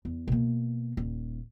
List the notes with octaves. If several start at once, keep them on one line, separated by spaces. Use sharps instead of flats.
E2
B2 A#3
D#1